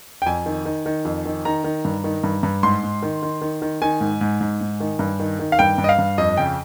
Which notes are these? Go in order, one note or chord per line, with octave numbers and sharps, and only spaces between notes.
G5
F2 G#5
D#3
D#3
D#3
F2
D#3
D#3 A#5
D#3
G2
D#3
G2
G2
G#2 C6
G#2
D#3
D#3
D#3
D#3
D#3 G#5
G#2
G#2
G#2
G#2
D#3
G2
D#3
D#3
F5
G2 G5
G2
D#5
F5
G2
F2 D#5
C#3 G5